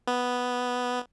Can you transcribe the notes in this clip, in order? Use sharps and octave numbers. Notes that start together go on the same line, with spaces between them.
B3